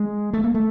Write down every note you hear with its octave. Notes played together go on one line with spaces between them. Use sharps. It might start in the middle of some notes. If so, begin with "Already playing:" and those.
Already playing: G#3
A3
A#3
A3